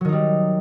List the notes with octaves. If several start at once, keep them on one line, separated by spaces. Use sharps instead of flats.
D#3 F#3 G3 D#4